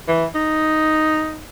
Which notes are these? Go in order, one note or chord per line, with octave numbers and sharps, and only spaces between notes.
E3
D#4